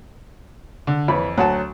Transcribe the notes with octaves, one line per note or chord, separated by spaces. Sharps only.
D3
F2 E3 C#5 B5
D2 F#3 F#5 A5